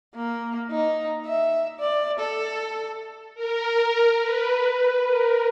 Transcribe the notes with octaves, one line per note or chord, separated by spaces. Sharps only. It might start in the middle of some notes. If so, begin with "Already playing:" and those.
A#3
D#4
E5
D5
A4
A#4
B4
A#4